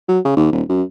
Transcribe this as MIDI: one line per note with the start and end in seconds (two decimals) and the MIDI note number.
0.09 0.19 54
0.25 0.33 49
0.37 0.47 39
0.52 0.62 27
0.69 0.83 42